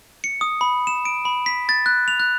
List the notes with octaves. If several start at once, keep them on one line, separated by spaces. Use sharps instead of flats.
C#7
D#6
B5
E7
D7
B5
B6
A6
F#6
F7
F#6